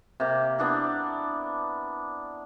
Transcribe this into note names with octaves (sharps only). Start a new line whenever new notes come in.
C3 A#3
B3 D4 E4